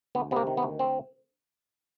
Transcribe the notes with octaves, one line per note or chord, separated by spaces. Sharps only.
D2 B3
C3 B3
A#3
D#3
B3
D2
C4